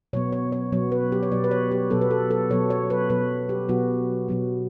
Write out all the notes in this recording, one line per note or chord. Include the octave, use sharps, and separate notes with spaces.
B2 F#3 B3 C#5
C#5
C#5
B2 F#3 B3 C#5
B4
G4
C#5
B2 F#3 B3 D5
B4
C#5
G4
B2 F#3 B3 A4
B4
A4
A4
B2 F#3 B3 C#5
C#5
B4
B2 F#3 B3 B4
G4
B2 F#3 B3 F#4
B2 F#3 B3